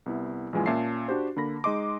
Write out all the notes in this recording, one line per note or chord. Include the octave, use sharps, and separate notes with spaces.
C2 B3 E4
A#1 F#2 E3 G#3 F4 G#5
A#2 C#4 E5 A5 C7
D4 F#4 G4 C5
D3 A#3 B5 A#6
G#3 D#4 D#5 C6 D6